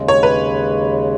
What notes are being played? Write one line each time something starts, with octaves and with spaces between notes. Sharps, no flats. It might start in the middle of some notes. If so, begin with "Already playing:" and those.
Already playing: D#2 C#3 G#3
C#5
B4